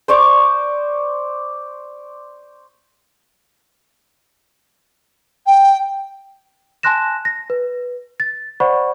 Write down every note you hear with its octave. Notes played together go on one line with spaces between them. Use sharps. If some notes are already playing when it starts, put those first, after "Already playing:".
C5 D5 C#6 D6
G5
G#5 A5 C6 F#6 A#6 E7
A#6
B4
A6
C5 D5 F#5 B5 C#6